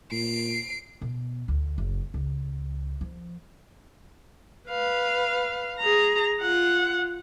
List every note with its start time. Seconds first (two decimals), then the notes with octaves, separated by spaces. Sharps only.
0.12 A#2 C7 D7
1.01 B2
1.48 D2
1.78 F#1
2.14 C#2
3.01 F3
4.69 B4 F5
5.79 G#4 A#5
6.41 F4 F#5